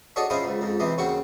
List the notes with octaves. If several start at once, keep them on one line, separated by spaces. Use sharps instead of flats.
D4 F#4 G#4 A4 C#5 D#5
C#4 E4 F4 G#4 C5 D#5
C#2 G#2
F2 G#2
C3 E3 C4 D#5
D#2 C#3 C4 F#4 C#6